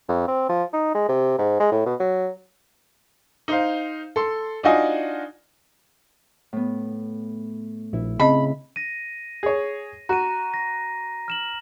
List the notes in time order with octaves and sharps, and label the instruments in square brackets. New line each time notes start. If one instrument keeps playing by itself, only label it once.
[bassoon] F2
C4
F3
D#4
G#3
C3
G#2
G#3
A2
B2
F#3
[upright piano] D#4 C5 F5
A4 C6
D4 D#4 F4 F#4 D#5 G#5
[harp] A2 B3
[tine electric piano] A#1 [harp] E4
[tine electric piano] C#3 [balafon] C4 D#5 [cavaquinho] B5
[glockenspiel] A#6 D#7
[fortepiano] G#4 C#5
[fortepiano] F#4 [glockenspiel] A#5 D#7
[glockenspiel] A#6
F6 E7 F#7